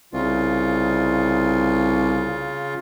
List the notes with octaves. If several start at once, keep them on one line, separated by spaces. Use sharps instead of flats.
C2 C#3 F4